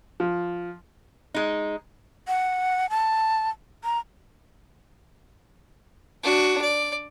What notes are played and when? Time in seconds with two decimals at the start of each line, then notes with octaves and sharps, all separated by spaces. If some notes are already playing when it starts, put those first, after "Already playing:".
0.20 F3
1.34 G#3 D#4
2.28 F#5
2.90 A5
3.84 A#5
6.23 D4 F#4
6.62 D5